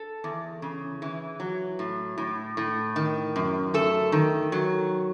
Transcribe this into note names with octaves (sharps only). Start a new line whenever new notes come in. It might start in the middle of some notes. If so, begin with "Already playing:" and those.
Already playing: A4
E2
C#3
E3
F#3
A2
A2
A2
D#3
F#2
A3 A4
D#3
F#3